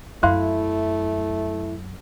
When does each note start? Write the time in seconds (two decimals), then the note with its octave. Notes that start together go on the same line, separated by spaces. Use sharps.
0.23 F#2 A3 E4 F5 C6 F#6